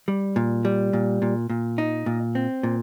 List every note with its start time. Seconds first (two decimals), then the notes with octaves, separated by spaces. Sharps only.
0.08 G3
0.36 A#2
0.65 G3
0.93 A#2
1.22 A#2
1.50 A#2
1.78 D#4
2.06 A#2
2.35 C4
2.63 A#2